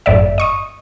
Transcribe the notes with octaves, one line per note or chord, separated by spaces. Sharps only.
G1 F#2 A2 D5 E5
D#5 C#6 D#6